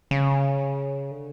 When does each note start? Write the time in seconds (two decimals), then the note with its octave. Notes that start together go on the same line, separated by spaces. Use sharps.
0.11 C#3
1.11 D3